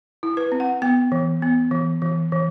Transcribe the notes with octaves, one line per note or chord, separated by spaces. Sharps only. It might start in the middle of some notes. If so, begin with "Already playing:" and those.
E4
B4
C4
F#5
B3 G5
E3
B3
E3
E3
E3